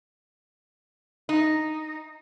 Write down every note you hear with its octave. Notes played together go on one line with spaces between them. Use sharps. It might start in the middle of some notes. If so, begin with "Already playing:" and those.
D#4